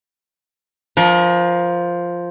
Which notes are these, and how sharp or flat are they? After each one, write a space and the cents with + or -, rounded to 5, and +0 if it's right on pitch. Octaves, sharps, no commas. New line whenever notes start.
F3 +0 A#4 +30